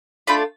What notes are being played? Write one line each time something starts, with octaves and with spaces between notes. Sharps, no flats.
A3 D4 F4 B5